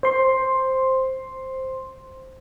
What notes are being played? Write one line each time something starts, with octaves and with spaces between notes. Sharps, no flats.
C5 C6